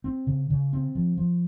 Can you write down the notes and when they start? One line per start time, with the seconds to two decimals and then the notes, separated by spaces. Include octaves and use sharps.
0.04 C4
0.27 C#3
0.50 C#3
0.73 C4
0.95 F3
1.17 F3